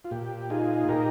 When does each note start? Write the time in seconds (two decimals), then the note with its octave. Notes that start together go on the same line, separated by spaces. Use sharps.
0.05 F4
0.11 A#2 G4
0.50 D#4 F4 G#4
0.89 A#2 G4 A#4